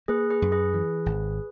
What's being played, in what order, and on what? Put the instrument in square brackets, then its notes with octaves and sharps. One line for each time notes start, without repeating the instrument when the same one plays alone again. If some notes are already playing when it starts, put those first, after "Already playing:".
[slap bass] A#3 [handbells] G#4 B4
[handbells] G#4 B4
[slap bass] F#2
[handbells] G#4 B4
[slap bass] E3
G#1